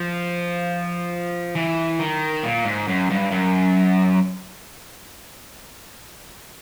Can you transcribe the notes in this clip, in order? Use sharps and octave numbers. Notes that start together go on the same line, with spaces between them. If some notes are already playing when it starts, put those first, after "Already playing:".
Already playing: F3
E3
D#3
A#2
G#2
F#2
G2
F#2